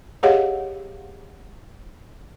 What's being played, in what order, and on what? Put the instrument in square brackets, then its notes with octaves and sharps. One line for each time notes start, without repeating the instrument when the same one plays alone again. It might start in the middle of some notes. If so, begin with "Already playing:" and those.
[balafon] G4 G#4 C#5 D#5 F5 F#5